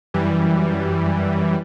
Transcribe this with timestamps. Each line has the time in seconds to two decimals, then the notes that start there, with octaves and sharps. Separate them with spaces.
0.14 F#2 E3 G3